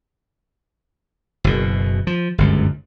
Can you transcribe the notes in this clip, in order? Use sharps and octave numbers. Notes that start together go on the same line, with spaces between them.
F#1 B2
F3
G1 C#2 F#2